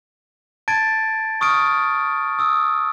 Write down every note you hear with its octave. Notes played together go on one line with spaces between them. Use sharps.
A5 G#6 A6 D7
C#6 D#6 F6 D7
D#6 E6